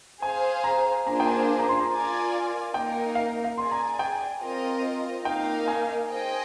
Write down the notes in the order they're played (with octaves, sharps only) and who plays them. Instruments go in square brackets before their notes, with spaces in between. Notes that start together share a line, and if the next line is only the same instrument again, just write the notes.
[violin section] G#4 C5 F5 [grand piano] G#5
[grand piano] A#5
[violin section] A#3 D4 F4 G#4 C5 [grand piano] A#5
[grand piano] G5
G#5
A#5
C6
A#5
[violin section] F4 A#4 D5 G#5
[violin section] A#3 D#4 A#4 [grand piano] G5
[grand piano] F5
F5
[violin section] G#4 D5 G#5 [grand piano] C6
[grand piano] A#5
G5
[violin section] C4 F4 A#4 D#5
[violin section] A#3 D#4 A#4 F5 [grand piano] G5
[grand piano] G#5
[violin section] G#4 C5 D#5 G5